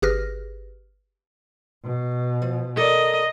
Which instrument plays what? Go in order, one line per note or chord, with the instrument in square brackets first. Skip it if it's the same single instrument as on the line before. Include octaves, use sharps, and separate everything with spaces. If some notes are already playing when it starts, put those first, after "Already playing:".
[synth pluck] G1 G4 G#4 B4 F6 A#6
[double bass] B2
[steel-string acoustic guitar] F3
[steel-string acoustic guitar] A4 A#4 D5 [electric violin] D#5